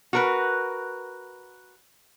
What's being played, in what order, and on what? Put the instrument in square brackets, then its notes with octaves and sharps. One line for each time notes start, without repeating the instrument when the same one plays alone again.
[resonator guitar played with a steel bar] F#4 A#4 B4